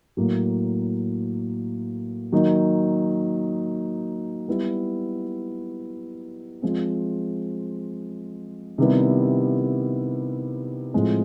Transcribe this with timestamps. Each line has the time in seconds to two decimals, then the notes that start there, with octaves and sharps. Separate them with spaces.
0.17 A2 F#3 A#3
2.32 D#3 F#3 A#3 D#4
4.48 G3 B3 E4
6.62 F3 G#3 C4
8.78 C3 D#3 G3 B3 E4
10.94 A2 F3 G#3 C4